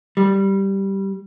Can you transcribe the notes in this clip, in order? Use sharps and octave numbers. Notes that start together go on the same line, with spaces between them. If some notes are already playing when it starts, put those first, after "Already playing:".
G3